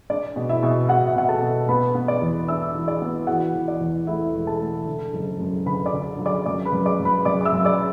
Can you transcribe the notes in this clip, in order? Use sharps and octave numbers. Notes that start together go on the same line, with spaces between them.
D4 D5
B2
E4 E5
B2
B2 F#4 F#5
E5
B2 F#5
A4 A5
B2
B3 B4 B5
B3
D5 D6
E2
D4 E5 E6
E3
D5 D6
B3
E3 F#4 F#5
E3
D5
E2
A3 E4 E5
E1
A4 A5
A3
D3
F#1
F#2
D3 B4 B5
D5 D6
D3
F#3
D5 D6
F#2 D5 D6
B4 B5
F#2
D5 D6
F#2
B4 B5
F#2 D5 D6
D6
E5 E6
F#2
D5 D6